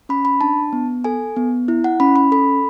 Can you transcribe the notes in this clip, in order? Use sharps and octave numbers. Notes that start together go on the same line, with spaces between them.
C#4 B5
B5
D4 A5
B3
A4 G#5
B3
E4
F#5
C#4 B5
B5
A4 B5